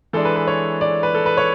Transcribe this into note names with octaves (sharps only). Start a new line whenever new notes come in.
E3 G#3 D4 A4
B4
B4
C#5
D5
B4
A4
B4
C#5